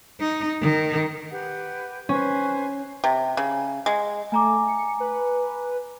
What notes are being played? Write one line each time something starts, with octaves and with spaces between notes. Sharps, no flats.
D#4
D#3
G4 B4 F#5
C#4 B4 C5 G#5
C3
C#3
G#3
A3 G#5 A#5 D6
C#7
B4